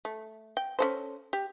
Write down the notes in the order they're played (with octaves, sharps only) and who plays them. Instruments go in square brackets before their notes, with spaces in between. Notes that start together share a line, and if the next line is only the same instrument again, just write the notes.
[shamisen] A3
G5
C#4 A4 C5
G4